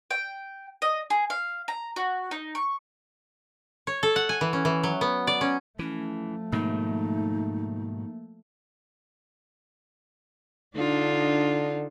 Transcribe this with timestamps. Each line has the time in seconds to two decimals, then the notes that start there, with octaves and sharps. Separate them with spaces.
0.11 G5
0.82 D#5
1.10 G#4
1.30 F5
1.68 A#5
1.96 F#4
2.31 D#4
2.55 C#6
3.87 C#5
4.03 A4
4.16 F#5
4.29 G#5
4.41 E3
4.53 C#4
4.65 E3
4.83 F#3
5.01 B3
5.27 D5
5.41 C#4
5.79 E3 F3 A3 C#4
6.53 G#2 B2 D#3 A#3 D#4
10.76 D3 D4 D#4 F4